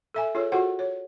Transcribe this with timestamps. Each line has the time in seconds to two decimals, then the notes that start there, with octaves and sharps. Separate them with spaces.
0.14 A4 E5 G#5
0.35 F4 G#4 A4 C#5
0.52 F4 F#4 G#4 A4 C5 F#5
0.79 C#5